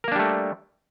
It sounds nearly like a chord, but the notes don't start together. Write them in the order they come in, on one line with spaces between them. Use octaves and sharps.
A#4 A#3 D4 G3 A3